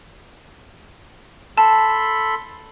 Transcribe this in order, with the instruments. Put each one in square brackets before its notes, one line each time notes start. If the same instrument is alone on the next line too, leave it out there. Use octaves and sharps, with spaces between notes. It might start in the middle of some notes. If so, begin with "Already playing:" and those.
[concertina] A4 B5 C6 [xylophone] A5